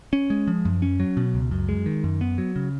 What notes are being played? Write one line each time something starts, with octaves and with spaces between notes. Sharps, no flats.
C#4
G#3
F3
F#2
C#4
F#3
B2
C#2
F#2
G#3
D#3
F#2
B3
F#3
C#3